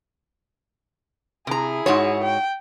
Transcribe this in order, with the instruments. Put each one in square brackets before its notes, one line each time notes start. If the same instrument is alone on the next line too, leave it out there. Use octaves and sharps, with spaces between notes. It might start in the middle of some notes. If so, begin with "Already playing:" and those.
[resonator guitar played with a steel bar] C3 A#5 [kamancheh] E4 G#4
[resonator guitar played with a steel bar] G#2 F#4 C#5
[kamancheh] G5